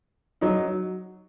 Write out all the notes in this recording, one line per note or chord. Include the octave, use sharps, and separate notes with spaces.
F#3 D#4